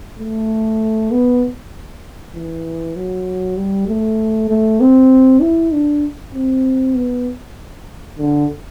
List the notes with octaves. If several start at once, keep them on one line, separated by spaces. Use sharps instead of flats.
A3
B3
E3
F#3
G3
A3
A3
C4
E4
D4
C4
B3
D3